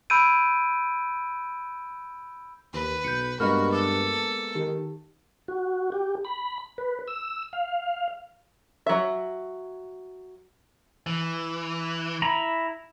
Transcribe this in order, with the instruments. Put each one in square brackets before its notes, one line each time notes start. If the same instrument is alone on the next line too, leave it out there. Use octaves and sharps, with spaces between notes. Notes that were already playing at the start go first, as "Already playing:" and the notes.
[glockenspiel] B5 E6 G6 G#6 D7 D#7
[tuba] D#2 [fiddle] B4
[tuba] B1 [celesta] G6 C#7
[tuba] G2 [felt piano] G#3 A#3 B3 [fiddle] F#4 [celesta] D#5 B5 F6
[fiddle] A4 [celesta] D6
[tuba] D#3 [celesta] G4
[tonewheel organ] F#4
G4
B5
B4
E6
F5
[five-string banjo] F#3 E5
[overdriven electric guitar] E3
[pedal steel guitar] E4 A#5 B5